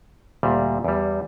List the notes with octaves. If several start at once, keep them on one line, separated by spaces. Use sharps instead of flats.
D2 A#2 G3
E2 G3